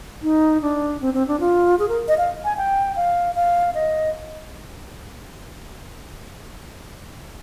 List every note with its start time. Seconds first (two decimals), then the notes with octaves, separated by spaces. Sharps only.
0.23 D#4
0.62 D4
1.01 C4
1.14 C4
1.28 D4
1.40 F4
1.79 G#4
1.89 A#4
2.08 D#5
2.18 F5
2.44 G#5
2.57 G5
2.96 F5
3.35 F5
3.75 D#5